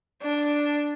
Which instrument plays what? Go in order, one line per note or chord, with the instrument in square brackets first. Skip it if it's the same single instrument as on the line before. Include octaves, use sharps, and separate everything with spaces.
[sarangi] D4